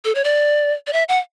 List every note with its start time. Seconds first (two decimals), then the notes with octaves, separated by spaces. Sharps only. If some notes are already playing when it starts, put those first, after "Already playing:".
0.05 A4
0.15 C#5
0.24 D5
0.87 D5
0.93 E5
1.09 F#5